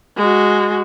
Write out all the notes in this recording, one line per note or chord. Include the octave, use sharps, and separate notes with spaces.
G#3 F#4